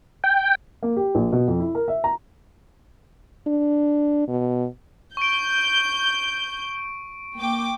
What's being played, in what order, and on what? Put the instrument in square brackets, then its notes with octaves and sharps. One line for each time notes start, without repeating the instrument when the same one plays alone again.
[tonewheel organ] G5
[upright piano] A#3
G4
A#1
B2
F2
E4
A#4
E5
A#5
[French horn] D4
B2
[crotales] C#6 D7 [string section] G6
[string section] A#3 G5 D6